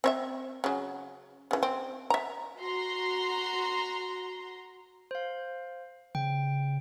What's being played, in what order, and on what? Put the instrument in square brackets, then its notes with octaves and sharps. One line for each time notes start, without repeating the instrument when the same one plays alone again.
[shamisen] C4 C#5 E5
C#3 F#3
C#3 E3
C4
E5 A#5
[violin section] F#4 A#5 C6
[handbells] C5 F5
[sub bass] C#3 [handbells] G5